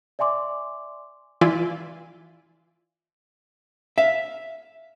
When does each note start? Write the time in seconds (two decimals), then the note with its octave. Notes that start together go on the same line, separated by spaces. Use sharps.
0.19 D5 E5 G#5 C6 D6
1.41 E3 F4 D5 E5 G#5
3.98 E5 F5